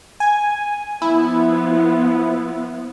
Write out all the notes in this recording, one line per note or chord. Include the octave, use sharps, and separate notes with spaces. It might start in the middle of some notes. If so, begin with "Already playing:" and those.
G#5
F3 B3 E4